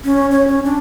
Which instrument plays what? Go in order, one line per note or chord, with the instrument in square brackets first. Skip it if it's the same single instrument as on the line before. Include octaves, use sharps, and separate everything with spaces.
[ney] C#4
C#5
C#4
D4